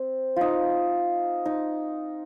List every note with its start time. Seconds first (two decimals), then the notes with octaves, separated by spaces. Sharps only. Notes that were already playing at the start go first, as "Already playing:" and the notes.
Already playing: C4
0.36 D#4 F4
1.45 D#4